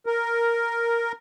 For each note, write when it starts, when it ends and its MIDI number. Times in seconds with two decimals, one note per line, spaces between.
0.06 1.12 70